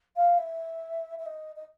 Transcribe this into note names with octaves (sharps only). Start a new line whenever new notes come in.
F5
E5
E5
D#5
D#5